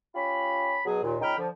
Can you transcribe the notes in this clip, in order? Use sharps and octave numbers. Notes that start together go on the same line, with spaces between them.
C#4 F4 G4 B5
B2 F#3 G#4
D#2 A#2
C#2 D#4 A#4 G5 B5 F6
D3 F3